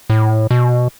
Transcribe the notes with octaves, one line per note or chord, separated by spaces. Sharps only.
A2
B2